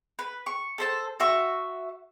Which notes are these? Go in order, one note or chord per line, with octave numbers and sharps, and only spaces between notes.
B4
C#6
A4 C5 A5
F#4 E5 C#6